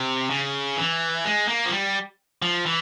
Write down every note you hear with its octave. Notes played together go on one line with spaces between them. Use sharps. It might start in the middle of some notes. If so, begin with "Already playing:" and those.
Already playing: C3
C#3
E3
G#3
A#3
F3
G3
F3
E3